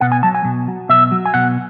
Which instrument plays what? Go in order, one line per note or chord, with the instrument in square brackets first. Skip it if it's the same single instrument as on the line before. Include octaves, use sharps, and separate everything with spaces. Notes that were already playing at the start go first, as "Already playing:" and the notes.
[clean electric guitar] B2 F#5
G#5
F#3 A5
G#5
B2
F#3
B2 E5
F#3
G#5
B2 F#5